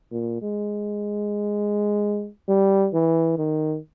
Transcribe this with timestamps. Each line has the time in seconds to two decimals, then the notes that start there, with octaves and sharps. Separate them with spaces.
0.12 A#2
0.42 G#3
2.49 G3
2.93 E3
3.38 D#3